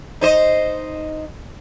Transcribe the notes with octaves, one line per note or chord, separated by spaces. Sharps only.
D#4 C5 D#5